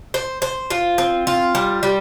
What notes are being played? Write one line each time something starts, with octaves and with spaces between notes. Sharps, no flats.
C5
C5
F4
C4
F4
G3
G3